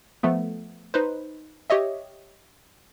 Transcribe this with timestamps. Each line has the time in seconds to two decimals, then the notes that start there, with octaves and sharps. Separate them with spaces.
0.23 F3 A3 B3
0.94 D#4 B4 C5
1.70 G4 C#5 D#5 E5